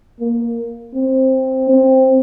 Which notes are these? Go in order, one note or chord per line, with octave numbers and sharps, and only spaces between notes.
A#3
C4
C4